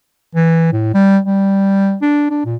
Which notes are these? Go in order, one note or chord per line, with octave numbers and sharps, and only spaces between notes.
E3
A2
G3
G3
D4
D4
A#2